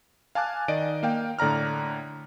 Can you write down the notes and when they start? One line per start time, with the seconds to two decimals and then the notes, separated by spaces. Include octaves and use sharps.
0.35 F5 G#5 A5 D6 F#6
0.68 D#3 D5 D#5 D7
1.03 A#3 F5 G5
1.39 A2 D3 D5 A#5 F6